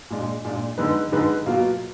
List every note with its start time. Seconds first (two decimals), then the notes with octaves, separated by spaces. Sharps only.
0.10 A#2 G#3 D4
0.45 A#2 G#3 D4
0.78 D3 G#3 D#4 G#4 B4
1.12 D3 G#3 D#4 G#4 B4
1.46 B2 F#3 A#3 F4